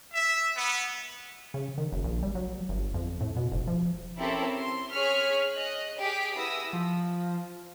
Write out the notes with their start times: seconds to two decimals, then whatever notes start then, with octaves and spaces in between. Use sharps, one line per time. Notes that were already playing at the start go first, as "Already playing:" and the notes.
0.12 E5
0.54 B3
1.54 C#3
1.78 D#3
1.92 F#1
2.04 A#1
2.23 G3
2.35 F#3
2.69 G1
2.94 F2
3.21 A2
3.36 B2
3.52 F1
3.67 F3
4.18 C4 C#4 E4 G4 A4 A#4
4.56 C6
4.92 C#4 G#4 C#5 F6 B6
5.54 D#5 F#6
5.98 G4 G#4 B6 D7
6.36 B3 E4 B4 D#6 E6 A#6
6.73 F3